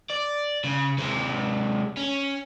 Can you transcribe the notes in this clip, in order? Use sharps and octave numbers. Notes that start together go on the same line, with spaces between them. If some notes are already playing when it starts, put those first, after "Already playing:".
D5
C#3
C3 G#3
C#4